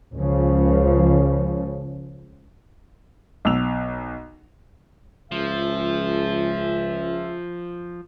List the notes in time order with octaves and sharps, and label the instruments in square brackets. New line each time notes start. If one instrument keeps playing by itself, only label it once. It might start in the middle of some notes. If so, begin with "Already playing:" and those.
[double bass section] C#2 C#3 F3
[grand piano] B1 E6 F7
[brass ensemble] C#2 G#4 E5 [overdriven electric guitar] F3